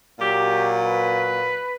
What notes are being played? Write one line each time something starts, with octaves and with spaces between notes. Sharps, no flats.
A#2 F#3 G4
B4